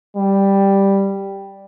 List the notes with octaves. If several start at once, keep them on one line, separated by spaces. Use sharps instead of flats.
G3